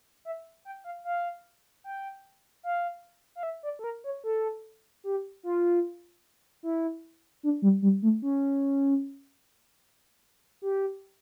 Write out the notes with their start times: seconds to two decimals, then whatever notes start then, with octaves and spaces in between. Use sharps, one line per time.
0.25 E5
0.65 G5
0.84 F5
1.05 F5
1.84 G5
2.63 F5
3.35 F5
3.43 E5
3.63 D5
3.79 A4
3.84 A#4
4.04 C#5
4.24 A4
5.04 G4
5.43 F4
6.63 E4
7.43 D4
7.62 G3
7.82 G3
8.02 A3
8.22 C#4
10.62 G4